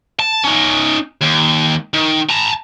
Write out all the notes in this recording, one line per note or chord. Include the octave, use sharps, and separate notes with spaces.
A5
C#4 D#4
D#2
D#3
A5 A#5